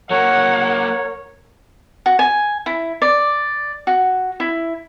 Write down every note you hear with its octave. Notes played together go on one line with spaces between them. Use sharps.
F#3 A#3 A#4 C#5 F#5
F#4
G#5
E4
D5
F#4
E4